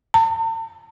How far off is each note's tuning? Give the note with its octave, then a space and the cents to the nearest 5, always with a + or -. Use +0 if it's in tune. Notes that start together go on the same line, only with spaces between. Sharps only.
A5 +45